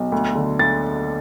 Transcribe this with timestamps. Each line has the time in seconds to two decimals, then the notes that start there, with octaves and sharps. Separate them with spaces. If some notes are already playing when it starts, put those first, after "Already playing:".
Already playing: B1
0.12 D2
0.35 D3
0.59 D2 A6